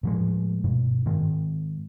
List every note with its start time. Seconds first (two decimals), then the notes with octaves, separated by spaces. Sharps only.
0.03 A2 F3 G#3
0.64 G2 B2
1.06 G#2 D#3